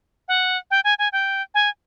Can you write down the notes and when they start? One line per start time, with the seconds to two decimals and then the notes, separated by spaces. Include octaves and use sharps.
0.28 F#5
0.71 G5
0.84 G#5
0.99 G#5
1.12 G5
1.54 G#5